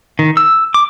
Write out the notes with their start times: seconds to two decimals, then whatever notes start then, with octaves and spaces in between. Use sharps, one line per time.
0.19 D#3
0.37 E6
0.74 D6